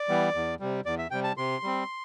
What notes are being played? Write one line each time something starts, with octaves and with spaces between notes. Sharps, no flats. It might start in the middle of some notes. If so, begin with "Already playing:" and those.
Already playing: D5
E3 G3 B3
E2
C3 G3
E2 D5
E5
C3 G3 G5
A5
C3 C6
G3 C4